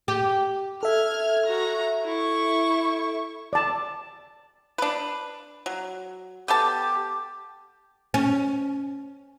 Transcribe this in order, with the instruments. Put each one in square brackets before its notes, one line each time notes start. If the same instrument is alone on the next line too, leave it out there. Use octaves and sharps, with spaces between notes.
[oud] G4
[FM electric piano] A4 E5 [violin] F6 G#6
[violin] F#4 A#5
E4 C#6
[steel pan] D5 A5
[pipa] D4 B4
F#3
[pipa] B3 A4 A5 [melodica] G4
[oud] C#4